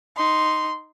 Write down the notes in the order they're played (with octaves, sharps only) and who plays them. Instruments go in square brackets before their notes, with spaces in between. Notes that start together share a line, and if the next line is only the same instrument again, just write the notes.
[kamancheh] D#4 C6